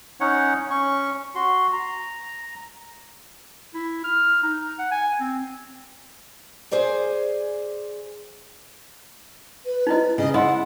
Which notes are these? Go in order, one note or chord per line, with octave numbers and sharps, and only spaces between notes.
C#4 D#4 C#5 F#5
C#4 C#6
F#4 C6
A#5
E4
F6
D#4
F#5
G#5
C4
G#4 C5 D5 G#5
B4
D#4 E4 D#5
C#3 D#5
E4 D#5 F#5 C6